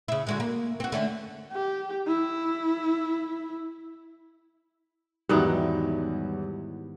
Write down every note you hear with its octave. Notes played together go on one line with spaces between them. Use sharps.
C#3 E4
D3 G#3 F#4
A#3
C4 F#4
D3 A3 C#4
G4
E4
E2 G#2 D#3 E3 F#3 G3 B3 E4